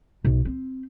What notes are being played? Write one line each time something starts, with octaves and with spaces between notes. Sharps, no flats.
B1
C4